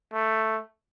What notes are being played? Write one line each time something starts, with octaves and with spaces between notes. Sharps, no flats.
A3